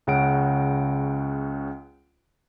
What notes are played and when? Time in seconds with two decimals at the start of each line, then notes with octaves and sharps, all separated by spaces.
0.07 C#2 C#3 F#5 D7